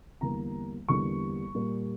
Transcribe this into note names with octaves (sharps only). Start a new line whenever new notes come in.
E2 D3 G3 A#3 A#5
E2 D3 G3 A#3 C#6
A#2 G3 A#3